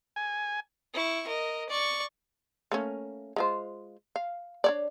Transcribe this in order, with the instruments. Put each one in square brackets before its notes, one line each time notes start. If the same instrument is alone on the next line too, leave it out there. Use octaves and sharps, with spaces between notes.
[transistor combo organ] G#5
[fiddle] E4 C#6
A#4 D#5
D5 C#6
[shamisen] A3 A#3 C#4
G#3 F4 C5
F5
D4 C#5 D5